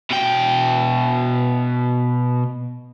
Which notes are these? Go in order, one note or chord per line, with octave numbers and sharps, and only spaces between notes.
B2 G5